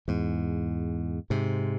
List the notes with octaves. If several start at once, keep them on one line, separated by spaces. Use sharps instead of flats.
E2 G#2
G#2 C3